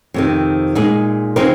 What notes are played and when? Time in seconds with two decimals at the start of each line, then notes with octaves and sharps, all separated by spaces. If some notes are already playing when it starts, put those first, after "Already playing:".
0.14 F2 C3 D#3
0.75 A#2 G#3 D#4 G#4
1.36 C#3 F3 C4 D#4 A#4